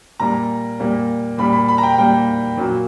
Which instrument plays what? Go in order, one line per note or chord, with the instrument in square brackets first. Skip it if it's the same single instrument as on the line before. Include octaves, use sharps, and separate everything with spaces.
[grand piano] A#2 G3 A#3 A#5
A#2 G3 A#3
A#2 G3 A#3 B5
B5
B5
A#5
G5
A#2 G3 A#3 G5
A#2 F#3 A#3